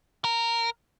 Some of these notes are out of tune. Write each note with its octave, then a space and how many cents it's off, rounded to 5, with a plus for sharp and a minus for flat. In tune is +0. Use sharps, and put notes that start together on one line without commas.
A#4 -10